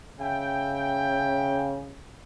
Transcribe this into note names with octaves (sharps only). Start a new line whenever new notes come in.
C#3 E5 G5